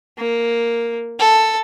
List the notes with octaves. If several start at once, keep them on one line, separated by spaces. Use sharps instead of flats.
A#3
A4